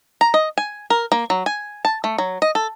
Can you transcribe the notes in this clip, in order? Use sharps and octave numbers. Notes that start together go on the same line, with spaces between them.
A#5
D#5
G#5
A#4
A#3
F#3
G#5
A5
A3
F#3
D#5
A4